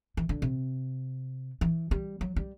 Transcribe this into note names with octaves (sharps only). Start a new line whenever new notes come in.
E3
D3
C3
E3
G3
F#3
G3